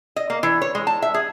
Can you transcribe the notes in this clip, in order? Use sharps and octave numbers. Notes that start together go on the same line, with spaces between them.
D#5
A#3
E3
C#5
G#3
A5
E5
G#4